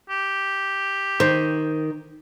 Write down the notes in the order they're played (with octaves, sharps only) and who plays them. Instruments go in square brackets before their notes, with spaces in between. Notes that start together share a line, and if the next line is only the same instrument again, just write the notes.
[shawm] G4
[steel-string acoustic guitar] D#3 [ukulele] C5